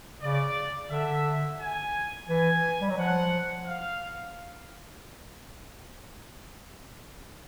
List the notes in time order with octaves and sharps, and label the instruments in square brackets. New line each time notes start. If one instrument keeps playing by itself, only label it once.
[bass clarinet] C#3 [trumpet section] D5
[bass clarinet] D3 [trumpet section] E5
[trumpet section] G#5
[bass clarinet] E3 [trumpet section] G#5
[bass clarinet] G3
F#3
[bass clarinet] F3 [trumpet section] F#5
[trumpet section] F5